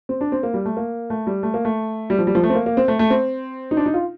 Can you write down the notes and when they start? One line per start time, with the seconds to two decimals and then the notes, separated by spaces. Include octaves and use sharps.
0.09 C4
0.21 D4
0.32 C4
0.43 A#3
0.54 G3
0.65 A3
0.77 A#3
1.10 A3
1.27 G3
1.43 A3
1.54 A#3
1.65 A3
2.10 G3
2.19 F3
2.27 G3
2.35 F3
2.44 A3
2.50 C4
2.55 A#3
2.66 A#3
2.77 C4
2.88 A3
2.99 A3
3.10 C4
3.71 D#4
3.77 D4
3.86 D#4
3.94 F4